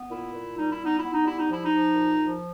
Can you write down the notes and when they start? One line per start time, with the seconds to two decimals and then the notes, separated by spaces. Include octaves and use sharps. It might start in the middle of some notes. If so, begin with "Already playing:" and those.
Already playing: B3
0.11 A#2 E4
0.34 A#2
0.57 G3 D#4
0.71 E4
0.79 B3 D#4
0.97 B3 E4
1.11 D#4
1.25 G3 E4
1.38 D#4
1.48 F3 E4
1.65 D#4
1.71 F3
1.94 A#2
2.16 F3